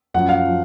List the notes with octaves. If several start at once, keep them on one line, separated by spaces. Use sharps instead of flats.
F#2 F3 F#5
F5
F3